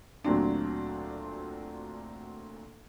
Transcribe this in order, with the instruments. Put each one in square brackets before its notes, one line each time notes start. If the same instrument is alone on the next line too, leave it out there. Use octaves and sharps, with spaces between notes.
[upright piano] D2 A#2 F#3 C4 D4